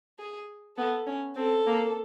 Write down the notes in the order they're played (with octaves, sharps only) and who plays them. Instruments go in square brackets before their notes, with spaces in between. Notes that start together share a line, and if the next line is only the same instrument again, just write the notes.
[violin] G#4
[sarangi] B3 [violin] A4
[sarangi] C#4
[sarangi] C4 [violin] A4
[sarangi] A#3